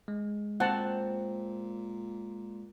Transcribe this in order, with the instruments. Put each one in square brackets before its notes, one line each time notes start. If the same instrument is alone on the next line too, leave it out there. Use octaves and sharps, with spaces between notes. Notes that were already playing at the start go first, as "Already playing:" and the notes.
[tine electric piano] G#3
[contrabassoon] A#2 [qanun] C4 [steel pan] F#5 A5